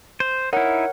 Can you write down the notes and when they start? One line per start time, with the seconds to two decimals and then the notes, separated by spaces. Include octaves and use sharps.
0.20 C5
0.53 D#4 E4 A#4 C#5 F#5